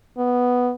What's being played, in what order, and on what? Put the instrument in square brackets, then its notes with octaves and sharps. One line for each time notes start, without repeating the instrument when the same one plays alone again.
[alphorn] B3